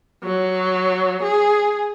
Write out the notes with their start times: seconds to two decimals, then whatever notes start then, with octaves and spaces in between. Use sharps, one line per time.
0.24 F#3
1.23 G#4